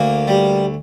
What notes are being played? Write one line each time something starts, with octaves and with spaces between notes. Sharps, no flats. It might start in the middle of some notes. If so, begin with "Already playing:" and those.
Already playing: D2 A#3
G3